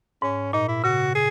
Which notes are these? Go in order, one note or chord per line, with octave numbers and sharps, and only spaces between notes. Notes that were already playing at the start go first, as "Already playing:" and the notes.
G#2 C#4
A#2 D#4
E4
C#3 F#4
G#4